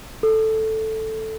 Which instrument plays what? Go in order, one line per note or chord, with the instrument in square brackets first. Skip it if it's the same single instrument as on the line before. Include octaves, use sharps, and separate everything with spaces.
[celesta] A4